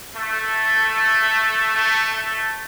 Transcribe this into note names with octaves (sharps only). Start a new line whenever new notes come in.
A3
A3
A3